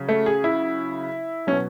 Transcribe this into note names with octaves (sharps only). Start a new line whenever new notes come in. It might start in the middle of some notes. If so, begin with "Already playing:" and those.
Already playing: C#3 F#3
A3
G#4
E4
B2 F#3 C#4